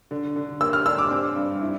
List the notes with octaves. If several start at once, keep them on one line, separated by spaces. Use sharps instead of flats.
D3
D3
A#3 E6
F6
D4 E6
D6
C4
G2
E4